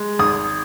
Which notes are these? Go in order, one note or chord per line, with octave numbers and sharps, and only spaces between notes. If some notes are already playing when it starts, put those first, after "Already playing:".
Already playing: G#3
G#1 D#6